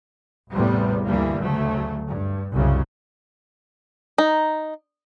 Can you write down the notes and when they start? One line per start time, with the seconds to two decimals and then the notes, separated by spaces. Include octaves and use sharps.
0.53 A1 E2 A2 C3 G3 B3
1.07 D2 G2 E3 G3 A#3
1.40 D2 C#3 F#3 A3
2.07 G2
2.53 C2 F#2 C#3
4.18 D#4